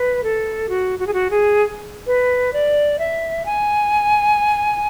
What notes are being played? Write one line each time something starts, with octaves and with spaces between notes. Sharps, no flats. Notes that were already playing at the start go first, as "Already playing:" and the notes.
Already playing: B4
A4
F#4
F#4
G#4
F#4
G#4
B4
D5
E5
G#5